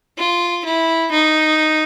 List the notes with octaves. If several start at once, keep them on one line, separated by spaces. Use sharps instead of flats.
F4
E4
D#4